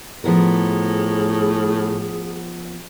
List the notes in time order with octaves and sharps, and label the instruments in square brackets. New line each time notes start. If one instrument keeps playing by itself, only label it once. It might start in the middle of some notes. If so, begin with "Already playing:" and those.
[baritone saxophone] A2 [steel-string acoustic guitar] F3 B3 A#4 [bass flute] G#4